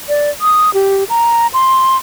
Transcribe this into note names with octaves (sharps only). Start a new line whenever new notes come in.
D5
D#6
G4
A#5
C6